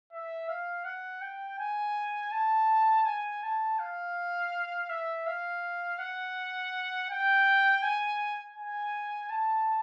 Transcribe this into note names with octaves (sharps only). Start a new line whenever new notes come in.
E5
F5
F#5
G5
G#5
A5
G#5
A5
F5
E5
F5
F#5
G5
G#5
G#5
A5